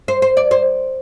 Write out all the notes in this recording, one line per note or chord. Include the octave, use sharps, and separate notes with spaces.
C5
C5
D5
C5